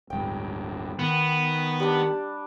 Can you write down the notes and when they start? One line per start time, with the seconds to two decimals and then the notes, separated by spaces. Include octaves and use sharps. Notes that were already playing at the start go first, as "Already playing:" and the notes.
0.10 D1 G2 G5
0.99 D#3 B3
1.80 G3 D4